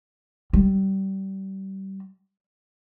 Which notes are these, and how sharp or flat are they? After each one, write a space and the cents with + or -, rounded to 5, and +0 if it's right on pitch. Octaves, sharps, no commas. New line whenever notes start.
G3 -25